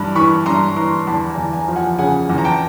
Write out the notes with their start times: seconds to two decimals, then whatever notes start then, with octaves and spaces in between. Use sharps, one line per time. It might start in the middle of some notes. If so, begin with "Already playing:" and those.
Already playing: G2 E3 B5
0.15 E3 B5 C#6
0.46 G2 A#5 C6
0.76 E3 A#5 C6
1.07 E2 A5 B5
1.30 G#5 A#5
1.37 E2
1.53 G#5 A#5
1.68 F3
1.76 F#5 G#5
1.99 C#3 F#5 G#5
2.30 E2
2.38 A#5
2.44 G5 A5